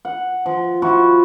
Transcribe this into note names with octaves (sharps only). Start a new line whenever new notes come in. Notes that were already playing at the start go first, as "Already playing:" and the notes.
F#5
F3
F3 E4 F#4